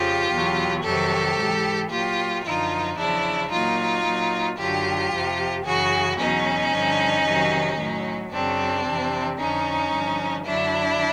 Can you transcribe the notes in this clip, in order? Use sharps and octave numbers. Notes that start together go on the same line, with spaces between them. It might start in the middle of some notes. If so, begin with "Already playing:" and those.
Already playing: F2 C#3 F3 F4 G4
E2 B2 F#3
F2 C3 D#3 F#3 G4 A4
G#2 E3
A#2 F#3 F4 G4
F#2 D3 F3 D#4 F4
E2 C#3 F3 D4 E4
A#2 F#3 D#4 F4
A#2 F#3
F#2 D3 F#3 F4 G4
F2 C3 F3
F#2 C#3 E3 F#4 G#4
E2 B2 F#3 C#4 D#4
G2 D3 F3
F2 C3 D#3 F#3
A2 F#3
F#2 C#3 F#3 C4 D4
F2 C3 E3
F2 D3 F3 C#4 D#4
G2 D3 F3
F#2 D3 F#3 D4 E4